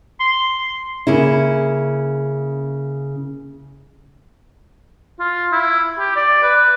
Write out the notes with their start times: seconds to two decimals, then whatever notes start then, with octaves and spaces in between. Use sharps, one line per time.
0.20 C6
1.07 C#3 A#3 E4
5.19 F4
5.52 E4
5.99 G4
6.16 D5
6.43 B4